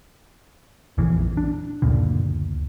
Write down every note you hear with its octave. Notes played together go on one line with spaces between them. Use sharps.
A#1 F2 E3
D4
F#1 D2 A#2 D3